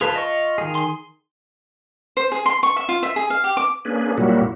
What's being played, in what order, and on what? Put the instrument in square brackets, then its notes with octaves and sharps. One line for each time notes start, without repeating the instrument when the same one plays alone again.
[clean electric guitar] F4 [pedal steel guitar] G#4 B4 A5
[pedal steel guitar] D#5 C#6
D#3 G#4
[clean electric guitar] C6
[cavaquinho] C5
G#4
C6
C#6
E5
F4
E5
G#4
F5
G4
D6
[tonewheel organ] A#3 C#4 D4 G#4 B4
A#2 F#3 G3 A#3 E4 F#4